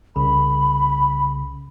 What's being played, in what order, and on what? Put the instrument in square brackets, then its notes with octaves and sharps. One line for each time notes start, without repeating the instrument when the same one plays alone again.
[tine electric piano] C2 C#3 [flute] B5